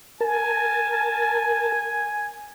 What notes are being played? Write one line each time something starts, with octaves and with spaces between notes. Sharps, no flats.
A#4 G#5 A5